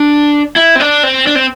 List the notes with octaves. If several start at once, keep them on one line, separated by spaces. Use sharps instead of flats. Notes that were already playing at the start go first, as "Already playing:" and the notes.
Already playing: D4
E4
C4
D4
C4
D4
C4